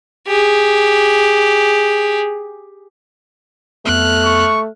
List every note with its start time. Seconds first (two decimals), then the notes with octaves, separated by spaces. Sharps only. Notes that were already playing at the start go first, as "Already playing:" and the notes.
0.27 G4 G#4
3.86 F2 A3 B3 A4 F6 F#6
4.25 C#6